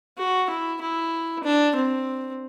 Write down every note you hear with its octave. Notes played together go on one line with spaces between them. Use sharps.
F#4
E4
E4
D4
C4